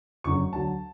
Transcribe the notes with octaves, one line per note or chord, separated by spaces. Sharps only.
F#1 F#2 D3 C#6
D2 D3 F#3 A5